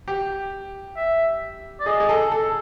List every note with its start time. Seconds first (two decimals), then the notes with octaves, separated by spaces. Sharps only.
0.08 G4
0.97 E5
1.80 D5
1.86 G#4 D#5
2.00 G#4
2.09 A4
2.32 A4